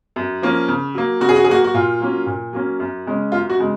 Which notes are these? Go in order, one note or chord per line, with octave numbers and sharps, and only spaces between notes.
F#2
F3 A#3 C#4
C#3
F#3 A#3
C#3 F#4
G#4
F#4
G#4
F#3 A#3 F#4
F#4
A#2 F4
F#3 A#3 C#4
A#2
F#3 A#3 C#4
F#2
C#3 G#3 C#4
F#2 F4
F#4
C#3 G#3